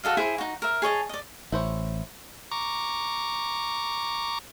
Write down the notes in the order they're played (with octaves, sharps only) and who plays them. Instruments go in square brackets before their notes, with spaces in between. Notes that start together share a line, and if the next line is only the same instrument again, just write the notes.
[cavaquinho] F#4 A4 D#5 F5
E4 G#4 C5 E5
D#4 F#4
A#4 E5
G#4 C#5 D#5 A5
D5 D#5
[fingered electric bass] A1 [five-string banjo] E4 C5 C#5
[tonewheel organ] A#5 C#6 D6